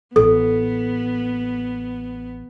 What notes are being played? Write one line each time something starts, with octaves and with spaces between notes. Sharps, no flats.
A1 B3 A4